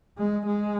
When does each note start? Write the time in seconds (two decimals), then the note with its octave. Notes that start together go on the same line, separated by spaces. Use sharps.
0.18 G#3
0.46 G#3